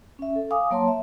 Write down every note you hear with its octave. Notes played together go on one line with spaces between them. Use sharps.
C#4 E5
A4
F5 G#5 D6 D#6
F#3 A#3 C#5 A5 C6
E5